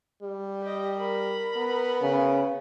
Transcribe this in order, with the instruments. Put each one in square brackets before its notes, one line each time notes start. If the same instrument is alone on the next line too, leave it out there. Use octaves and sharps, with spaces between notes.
[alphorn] G3
[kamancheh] G4 D#5
A#4 B5
[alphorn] B3
[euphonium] C#3